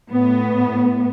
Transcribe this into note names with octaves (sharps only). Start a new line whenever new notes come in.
A2 B3